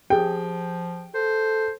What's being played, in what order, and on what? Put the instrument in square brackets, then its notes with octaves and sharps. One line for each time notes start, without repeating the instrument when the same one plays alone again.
[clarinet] F3 [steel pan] G4 G#4 [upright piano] G5
[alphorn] A4 [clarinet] C5